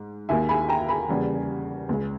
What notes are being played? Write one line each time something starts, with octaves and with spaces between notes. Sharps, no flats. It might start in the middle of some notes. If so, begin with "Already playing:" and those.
Already playing: G#2
D#2 D#3 A#3 E5 G#5
G#5 B5
G5 A#5
G#5 B5
E2 C#3 G3 A#3
C#2 C#3 G#3